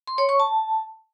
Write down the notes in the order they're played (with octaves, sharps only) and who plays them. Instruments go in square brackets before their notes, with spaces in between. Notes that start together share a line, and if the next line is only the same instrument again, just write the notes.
[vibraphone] C6
C#5
C#6
A5